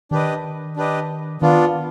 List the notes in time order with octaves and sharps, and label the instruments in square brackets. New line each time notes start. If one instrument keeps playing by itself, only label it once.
[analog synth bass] D#3 [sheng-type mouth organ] D4 G4 B4 D#5
[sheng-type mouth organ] D4 G4 B4 D#5
[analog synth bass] D#3 [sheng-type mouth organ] B3 D4 F4